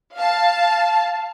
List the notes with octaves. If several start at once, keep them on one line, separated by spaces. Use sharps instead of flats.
F5 A5